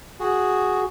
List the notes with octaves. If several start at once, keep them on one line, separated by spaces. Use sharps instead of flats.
F#4 G#4